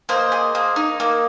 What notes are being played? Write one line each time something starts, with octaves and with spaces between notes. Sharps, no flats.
A#3 C5 D#5
G#4
A#3
D#4
A#3